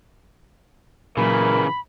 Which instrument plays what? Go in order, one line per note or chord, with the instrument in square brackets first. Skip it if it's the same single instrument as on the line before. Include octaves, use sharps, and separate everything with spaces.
[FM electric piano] A#2 F#3 [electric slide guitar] C#3 E3 [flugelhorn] A#4 [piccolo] B5